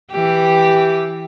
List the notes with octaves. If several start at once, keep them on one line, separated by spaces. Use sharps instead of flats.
E3 G4